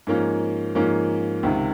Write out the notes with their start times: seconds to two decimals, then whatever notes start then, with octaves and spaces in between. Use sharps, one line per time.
0.07 G#2 F3 A#3 C#4
0.75 G#2 F3 A#3 C#4
1.43 C#2 C3 D#3